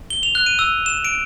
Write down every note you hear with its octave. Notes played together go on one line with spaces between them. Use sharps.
G7
F7
F#6
D#7
E6
E7
D7